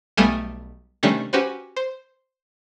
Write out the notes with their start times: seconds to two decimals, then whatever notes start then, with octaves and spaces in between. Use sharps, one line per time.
0.17 B1 G3 A3 B3 F5 G#5
1.03 C3 D#3 G3 A3 C#4 D4
1.33 C#4 F#4 G4 B4 C5
1.76 C5